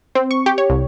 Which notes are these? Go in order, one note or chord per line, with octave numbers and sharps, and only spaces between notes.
C4
C#6
G4
C#5
C2